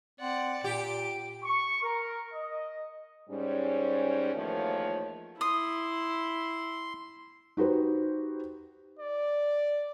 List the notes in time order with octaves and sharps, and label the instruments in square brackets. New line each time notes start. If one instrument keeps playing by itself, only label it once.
[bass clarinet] C4 [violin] D5 F#5
[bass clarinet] A#2 [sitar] G4 [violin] D7
[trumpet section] C#6
A#4
D#5
[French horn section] G#2 G3 C#4
E2 D#3 F3 A3 A#3 C#5
[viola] E4 [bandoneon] C6 [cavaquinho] D#6
[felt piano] D#4 F#4 G4 B4 C5
[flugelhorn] D5